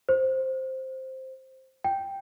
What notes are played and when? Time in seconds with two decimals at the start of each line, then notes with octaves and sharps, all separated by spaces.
0.09 C5
1.84 G5